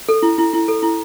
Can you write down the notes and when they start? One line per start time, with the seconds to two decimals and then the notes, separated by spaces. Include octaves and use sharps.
0.09 A4
0.23 E4
0.38 E4
0.53 E4
0.68 A4
0.83 E4